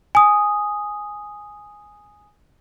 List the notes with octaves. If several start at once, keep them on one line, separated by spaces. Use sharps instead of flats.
G#5 D#6